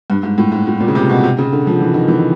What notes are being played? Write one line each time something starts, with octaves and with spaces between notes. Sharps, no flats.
G2
G#2
A2
G#2
A2
A#2
C#3
C3
B2
C3
C#3
D3
F3
E3
D#3
E3